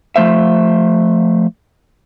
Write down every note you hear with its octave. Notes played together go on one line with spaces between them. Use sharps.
F3 A3 C5 E5